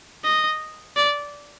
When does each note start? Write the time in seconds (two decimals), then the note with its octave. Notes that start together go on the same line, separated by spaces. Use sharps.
0.24 D#5
0.97 D5